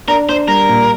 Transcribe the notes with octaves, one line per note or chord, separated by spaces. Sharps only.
D4 A#4
D4 C5
G3 A#4
A#2